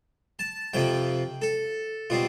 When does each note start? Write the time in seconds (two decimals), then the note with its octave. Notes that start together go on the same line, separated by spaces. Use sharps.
0.39 A5
0.74 F2 C3 F3 G5
1.42 A4
2.10 B2 G3 C4 F4